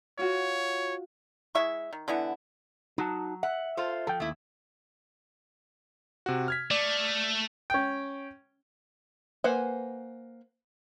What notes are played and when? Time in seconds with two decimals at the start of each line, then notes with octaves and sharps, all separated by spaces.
0.19 F4 F#4 C#5
1.55 G#3 E4 E5 C#6
1.93 D#3
2.08 D3 E3 B3 E4
2.98 F#3 D#4 F#4 A5
3.43 E5 F#5
3.77 F4 A4 C5
4.07 F3 A4 G5
4.20 D#2 A3 E4
6.26 C3 F#4
6.48 F6 G#6 B6
6.71 A3 D5
7.70 C#4 G5
9.44 A#3 B4 C5 F#5 G#5